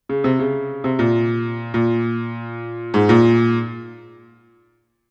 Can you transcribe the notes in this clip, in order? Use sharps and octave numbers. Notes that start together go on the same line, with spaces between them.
C#3
C3
C#3
C3
A#2
A#2
G#2
A#2